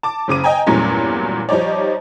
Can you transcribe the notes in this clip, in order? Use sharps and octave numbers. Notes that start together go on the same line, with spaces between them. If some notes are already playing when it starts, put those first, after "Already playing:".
A5 D6
F#1 C#3 D6 D#7
D#5 G5 G#5 A#5
E2 G2 A#2 F#3 A3 C#4
F3 G3 D#4 C#5 D5